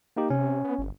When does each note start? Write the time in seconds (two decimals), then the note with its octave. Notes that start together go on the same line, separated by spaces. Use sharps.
0.16 A#3 D#4 G4
0.30 C3 C#4
0.64 B3
0.79 G1